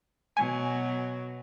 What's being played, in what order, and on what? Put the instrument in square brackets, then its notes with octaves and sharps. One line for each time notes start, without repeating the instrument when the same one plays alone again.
[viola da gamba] B2 F#3 [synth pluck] G#5